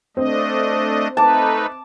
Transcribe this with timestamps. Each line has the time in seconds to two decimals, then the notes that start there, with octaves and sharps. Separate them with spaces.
0.17 A3 C4 D4 D#5
1.17 A3 D#4 B4 A5 D6